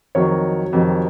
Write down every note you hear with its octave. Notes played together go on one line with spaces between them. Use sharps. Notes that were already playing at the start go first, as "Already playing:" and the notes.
F2 D#3 F#3 C#5
F2 C3 D#3 F#3